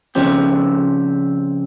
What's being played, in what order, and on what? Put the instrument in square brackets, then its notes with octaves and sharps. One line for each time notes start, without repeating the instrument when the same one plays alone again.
[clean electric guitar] C#3 F3 C4 G4